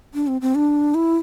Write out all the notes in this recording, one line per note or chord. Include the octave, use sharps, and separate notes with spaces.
D4
C4
C4
D4
E4